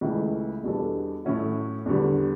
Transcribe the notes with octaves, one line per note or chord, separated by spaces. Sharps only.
C#2 C#3 E3 A3
E2 B2 G3 D4 A4
A2 F#3 A3 C#4 F#4
E2 D3 G3